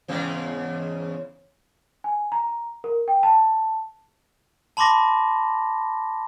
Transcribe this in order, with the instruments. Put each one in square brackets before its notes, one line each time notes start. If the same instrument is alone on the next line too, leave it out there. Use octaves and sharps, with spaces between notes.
[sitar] E2 G#2 C#3
[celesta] G#5
A#5
A#4
G5
A5
[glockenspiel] A5 B5 C6 D6 A#6